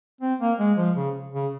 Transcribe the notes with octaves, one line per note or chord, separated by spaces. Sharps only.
C4
A#3
G#3
F3
C#3
C#3